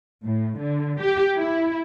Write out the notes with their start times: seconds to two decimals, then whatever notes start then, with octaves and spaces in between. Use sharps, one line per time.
0.24 A2
0.59 D3
1.01 G4
1.37 E4